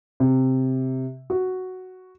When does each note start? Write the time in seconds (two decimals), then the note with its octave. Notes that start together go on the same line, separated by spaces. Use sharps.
0.20 C3
1.30 F#4